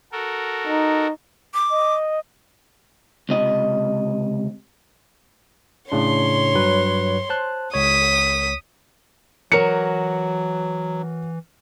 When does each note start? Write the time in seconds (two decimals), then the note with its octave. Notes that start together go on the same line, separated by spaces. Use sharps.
0.12 F#4 A4 A#4
0.67 D#4
1.54 D6
1.70 D#5
3.29 C#2 C3 D#5
5.92 A2 C#3 D4 C#5 C6
6.55 G2 F#3 B4
7.29 C5 A5 F#6
7.74 C#2 C#5 D#6 B6
9.52 E3 F#3 F#4 A#4 C#5 C#7